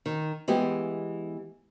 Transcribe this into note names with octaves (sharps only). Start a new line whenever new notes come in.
D#3
E3 G#3 B3 G4